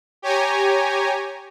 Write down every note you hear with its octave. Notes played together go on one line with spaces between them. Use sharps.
G4 C#5 G#5 A#5